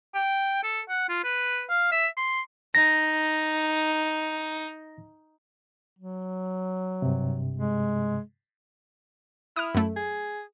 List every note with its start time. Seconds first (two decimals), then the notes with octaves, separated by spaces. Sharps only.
0.15 G5
0.63 A4
0.89 F#5
1.09 F4
1.24 B4
1.69 F5
1.92 E5
2.17 C6
2.75 D#4 A#6
5.99 F#3
7.02 G2 C3
7.56 G#3
9.56 E4 D#6 F6
9.75 F#2 A3
9.96 G#4